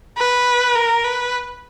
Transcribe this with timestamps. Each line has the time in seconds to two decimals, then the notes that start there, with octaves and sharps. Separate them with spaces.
0.18 B4
0.76 A#4
1.04 B4